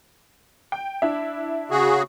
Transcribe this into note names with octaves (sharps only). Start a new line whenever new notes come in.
G5
D4 E4 E5
C#3 F#4 G#4